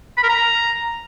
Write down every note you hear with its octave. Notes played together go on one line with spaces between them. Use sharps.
B5
A#4
A#5